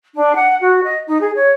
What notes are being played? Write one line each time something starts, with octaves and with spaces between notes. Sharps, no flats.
D4
F#5
F#4
D#5
D#4
G#4
C#5